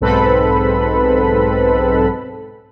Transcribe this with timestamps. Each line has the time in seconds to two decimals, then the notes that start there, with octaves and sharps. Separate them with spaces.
0.01 B1 G#2 C4 A4 B4 B5